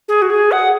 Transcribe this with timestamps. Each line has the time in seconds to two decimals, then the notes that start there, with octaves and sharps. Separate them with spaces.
0.08 G#4
0.22 F#4
0.30 G#4
0.52 F#5